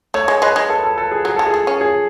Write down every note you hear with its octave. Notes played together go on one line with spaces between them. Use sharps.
A3 C#5
G#3
G#3 B4
G#3
A4
A4
A4
G#4
F#3 G#4
G#3 A4
G#4
A3
C#4
G#4